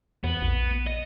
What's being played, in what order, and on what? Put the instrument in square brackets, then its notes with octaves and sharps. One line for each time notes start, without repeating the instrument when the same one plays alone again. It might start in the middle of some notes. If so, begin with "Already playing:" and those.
[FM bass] E2 [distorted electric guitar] B3
[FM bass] A#1
[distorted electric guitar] D#5